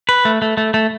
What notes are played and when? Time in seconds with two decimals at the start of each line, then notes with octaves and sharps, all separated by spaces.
0.09 B4
0.25 A3
0.42 A3
0.57 A3
0.74 A3